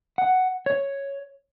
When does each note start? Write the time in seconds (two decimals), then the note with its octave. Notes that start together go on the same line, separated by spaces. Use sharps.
0.18 F#5
0.66 C#5